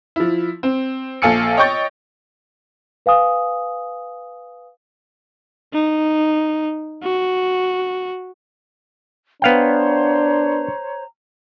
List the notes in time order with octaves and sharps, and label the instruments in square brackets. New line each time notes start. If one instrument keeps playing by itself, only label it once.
[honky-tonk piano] F3 E4
C4
A#1 A4 F5 G#5 E6 C#7
C#5 D#5 G5 C#6 G6 A6
[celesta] B4 F5 G#5 D#6
[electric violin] D#4
F#4
[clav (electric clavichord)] B3 F5 G5 [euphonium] D4 [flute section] C5 C#5 A#5